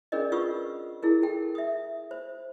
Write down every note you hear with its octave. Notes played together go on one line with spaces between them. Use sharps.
C#4 D4 G#4 A#4 D5 D#5
F4 B4 F#5 C#6 D#6 E6
E4 G#4 A#4
A4 G5
E5 D#6
C5